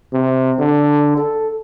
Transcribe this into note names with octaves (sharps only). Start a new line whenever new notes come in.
C3
D3
A4